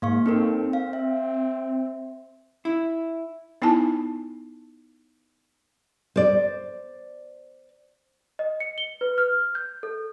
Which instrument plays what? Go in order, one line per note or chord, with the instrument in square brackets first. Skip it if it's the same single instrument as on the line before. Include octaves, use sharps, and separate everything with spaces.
[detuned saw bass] G#2 [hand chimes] A#3 F5 C#6
[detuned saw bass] C4 [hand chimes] D#4 A4 A#4
[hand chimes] F5
E5
[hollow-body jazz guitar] E4
[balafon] B3 D#4 E4 G#5 A5
[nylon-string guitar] C5 D5
[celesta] D#5
C#7
G7
B4
F6
G6
A4